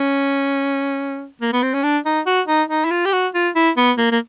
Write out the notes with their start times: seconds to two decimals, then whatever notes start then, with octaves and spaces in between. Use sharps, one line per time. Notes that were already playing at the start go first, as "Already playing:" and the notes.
Already playing: C#4
1.42 A#3
1.53 B3
1.63 C4
1.74 C#4
1.83 D4
2.05 D#4
2.26 F#4
2.48 D#4
2.69 D#4
2.85 E4
2.91 F4
3.05 G4
3.13 F#4
3.34 F4
3.55 E4
3.77 B3
3.98 A#3
4.12 A#3